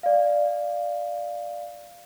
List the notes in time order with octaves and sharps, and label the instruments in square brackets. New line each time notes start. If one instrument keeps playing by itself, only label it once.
[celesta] D5 F5